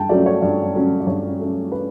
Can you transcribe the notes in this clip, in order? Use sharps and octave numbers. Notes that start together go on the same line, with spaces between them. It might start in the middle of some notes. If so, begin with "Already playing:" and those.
Already playing: G2 G5 A5
F#3 A3 C#4 D5
C#5
G2 D5
F#3 A3 C#4
D5
G2 C#5
F#3 A3 C#4
B4